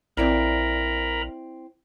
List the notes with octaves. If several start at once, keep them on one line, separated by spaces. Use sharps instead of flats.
A#1 C4 E4 A#4 D5 A#5 B5